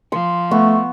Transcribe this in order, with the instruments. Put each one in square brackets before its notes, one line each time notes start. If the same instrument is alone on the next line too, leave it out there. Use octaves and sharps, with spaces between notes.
[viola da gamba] F3 [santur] C6
[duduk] A3 [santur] B3 C#6